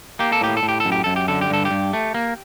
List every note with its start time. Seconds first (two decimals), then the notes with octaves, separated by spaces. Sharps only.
0.19 A#3 G4
0.32 A4
0.41 A2 G4
0.57 A4
0.63 A2
0.69 G4
0.80 A4
0.85 F#2
0.92 G4
1.04 F#2 A4
1.16 G4
1.28 D3 A4
1.41 G4
1.50 G2 A4
1.65 G4
1.71 G2
1.93 A3
2.14 A#3